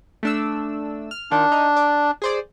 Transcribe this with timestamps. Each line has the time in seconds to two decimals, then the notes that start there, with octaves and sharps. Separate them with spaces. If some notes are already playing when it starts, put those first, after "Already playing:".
0.23 A3 D4 E6
1.11 F6
1.31 D#3 D4 F4
1.52 D#4
1.77 D5
2.22 G#4 C5 D5